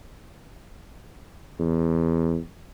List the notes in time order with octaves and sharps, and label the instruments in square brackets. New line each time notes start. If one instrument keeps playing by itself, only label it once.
[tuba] E2